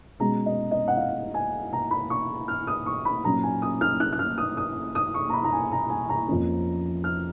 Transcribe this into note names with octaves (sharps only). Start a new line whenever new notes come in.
B2 G#3 C#4 A#5
D#5
D#5
F#5
F5
G#5
A#5
B5
C#6
F6
D#6
C#6
B5
A#2 F#3 C#4 A#5
G#5
D#6
F6
F#6
F#6
F6
D#6
D#6
D#6
C#6
A#5
B5
A#5
G#5
A#5
G#5
A#5
F2 F3 A#3 C#4
F6